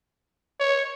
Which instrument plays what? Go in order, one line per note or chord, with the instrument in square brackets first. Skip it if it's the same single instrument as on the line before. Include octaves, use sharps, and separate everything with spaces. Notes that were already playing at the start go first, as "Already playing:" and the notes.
[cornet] C#5